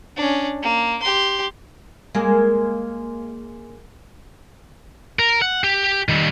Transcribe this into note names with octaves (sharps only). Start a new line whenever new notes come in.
C#4 D4
A#3
G4 C6
G#3 A#3 A#4
A#4
F#5
G4
D#3 G3